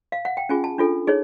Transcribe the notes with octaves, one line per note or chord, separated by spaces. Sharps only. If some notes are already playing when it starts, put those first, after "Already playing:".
F5
F#5
G5
C#4 F4 G#4 G#5
A5
D4 F4 A4
D#4 G#4 C#5